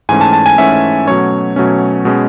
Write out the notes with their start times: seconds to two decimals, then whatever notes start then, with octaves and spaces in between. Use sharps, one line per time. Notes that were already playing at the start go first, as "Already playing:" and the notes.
0.09 G#2 E3 A3 C#4 G#5
0.21 A5
0.33 A5
0.46 G#5
0.58 G#2 E3 A3 C#4 E5
1.07 B2 F#3 A3 C#4 C#5
1.56 B2 F#3 A3 C#4
2.05 B2 G#3 C#4